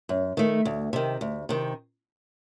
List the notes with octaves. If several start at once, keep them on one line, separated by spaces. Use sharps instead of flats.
F#2
D#3 A3
D2
C3 D#3
D2
C3 D#3